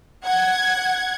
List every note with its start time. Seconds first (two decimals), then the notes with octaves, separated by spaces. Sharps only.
0.23 F#5 G#6